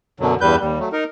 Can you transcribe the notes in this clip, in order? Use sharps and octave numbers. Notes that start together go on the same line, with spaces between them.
F#2 B2 D3 F#3
E2 G2 G3 B4 G6
D#2 G3
F#3 A3
D#4 A#4